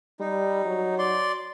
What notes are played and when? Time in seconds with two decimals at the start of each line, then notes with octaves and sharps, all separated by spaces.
0.20 G3 D#4
0.66 F#3
0.98 D5 C6